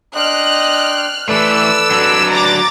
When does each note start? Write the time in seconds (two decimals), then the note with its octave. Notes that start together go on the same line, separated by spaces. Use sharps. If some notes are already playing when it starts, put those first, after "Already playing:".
0.16 D4 D#5 G5 C6 F6 F#6
1.29 E3 A3 A4 B4 D5 E6
1.91 F#3 D4
2.30 A#5 D6 A6